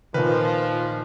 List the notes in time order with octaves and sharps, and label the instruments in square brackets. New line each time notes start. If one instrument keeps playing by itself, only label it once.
[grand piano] A#2 D#3 [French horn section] F3 [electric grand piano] B4